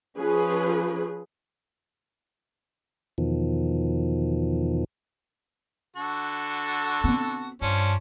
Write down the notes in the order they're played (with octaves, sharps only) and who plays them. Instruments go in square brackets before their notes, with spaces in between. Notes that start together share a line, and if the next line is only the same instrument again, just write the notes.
[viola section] F3 C#4 G#4 B4
[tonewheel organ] E2 B2 D#3 F3
[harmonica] D3 F#4 A4
[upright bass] B3 C4
[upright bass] G2 [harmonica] F3 C#4 D4